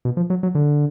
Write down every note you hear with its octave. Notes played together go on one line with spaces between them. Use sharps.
B2
F3
F#3
F#3
D3